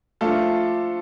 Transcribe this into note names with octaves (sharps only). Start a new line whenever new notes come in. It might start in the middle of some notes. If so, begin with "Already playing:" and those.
F3 A3 D4 F4 A4